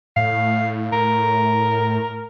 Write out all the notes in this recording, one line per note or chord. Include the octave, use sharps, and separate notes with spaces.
A2 F5
A2 A#4